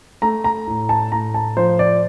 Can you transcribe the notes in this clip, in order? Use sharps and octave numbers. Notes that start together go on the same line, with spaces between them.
A3 A#5
A#5
A2
A5
A2 A#5
A5
F3 C5
D5